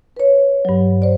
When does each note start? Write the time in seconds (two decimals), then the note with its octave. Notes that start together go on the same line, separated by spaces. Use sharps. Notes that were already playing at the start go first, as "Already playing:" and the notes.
0.17 B4 C#5
0.65 G2 F#3
1.02 C5 D5